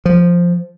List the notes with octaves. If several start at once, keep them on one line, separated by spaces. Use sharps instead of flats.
F3